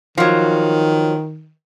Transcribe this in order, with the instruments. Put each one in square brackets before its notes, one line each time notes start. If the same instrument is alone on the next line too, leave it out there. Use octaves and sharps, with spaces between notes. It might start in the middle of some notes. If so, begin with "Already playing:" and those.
[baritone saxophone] D#3 [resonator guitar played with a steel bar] F3 F#3